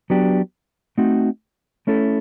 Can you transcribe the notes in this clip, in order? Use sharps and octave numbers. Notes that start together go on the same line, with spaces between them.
F#3 B3 D4 G4
A3 C4 D#4 F#4
A3 C#4 E4 A4